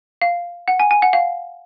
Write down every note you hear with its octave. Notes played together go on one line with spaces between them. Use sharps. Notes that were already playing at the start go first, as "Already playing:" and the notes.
F5
F#5
G#5
G#5
F#5
F5